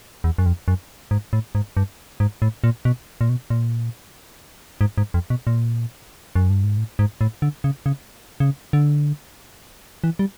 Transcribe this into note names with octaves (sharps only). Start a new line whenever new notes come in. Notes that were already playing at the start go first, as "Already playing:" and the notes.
E2
F#2
F2
F#2
G#2
A2
G#2
G2
G#2
A2
A#2
B2
A#2
B2
A#2
G#2
G#2
F2
B2
A#2
F#2
G2
G#2
A2
G#2
A2
D3
C#3
C#3
C#3
D3
E3
G3